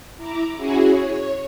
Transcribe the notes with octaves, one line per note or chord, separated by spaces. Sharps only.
E4 A#5 D6
C#4 E4 F#4 G#4
C#5